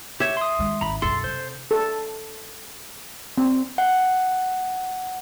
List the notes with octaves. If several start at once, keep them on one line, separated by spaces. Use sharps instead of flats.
G4 C#5 E5
C6 D#6
D#3 G#3
G#1 A#5 B5
B1 F#2 A4 C6
C3 C5
A4
C4
F#5